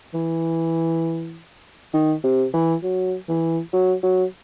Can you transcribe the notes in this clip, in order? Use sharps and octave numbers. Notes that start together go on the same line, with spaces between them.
E3
D#3
C3
E3
F#3
E3
F#3
F#3